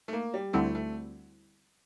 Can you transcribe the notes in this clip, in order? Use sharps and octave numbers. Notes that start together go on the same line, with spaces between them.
A3
A#3
G3
D2 D3 G3 A3 C4 E4
A3